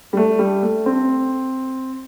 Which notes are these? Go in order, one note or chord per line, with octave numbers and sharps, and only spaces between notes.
G3
A3
G3
A3
C4